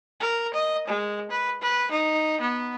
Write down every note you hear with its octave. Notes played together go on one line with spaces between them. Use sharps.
A#4
D#5
G#3
B4
B4
D#4
B3